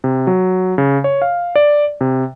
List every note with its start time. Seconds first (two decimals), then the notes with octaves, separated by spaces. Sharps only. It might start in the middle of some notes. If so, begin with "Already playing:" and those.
0.04 C3
0.27 F#3
0.78 C#3
1.04 C#5
1.22 F5
1.56 D5
2.01 C3